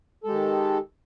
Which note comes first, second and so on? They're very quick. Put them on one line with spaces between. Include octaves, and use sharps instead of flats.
A4 G#3 G4 D#3